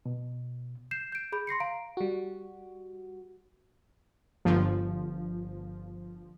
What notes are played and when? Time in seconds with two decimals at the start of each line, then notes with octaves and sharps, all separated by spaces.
0.06 B2
0.91 G6 C7 E7
1.12 G6 D7
1.32 G#4 B5 G6
1.47 C6 A#6 C7 C#7
1.60 F5 A#5 D7
1.97 G3 F#4
4.45 G1 F3